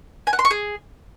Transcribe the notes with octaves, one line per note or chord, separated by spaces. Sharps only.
G#5
F#5
C6
C#6
G#4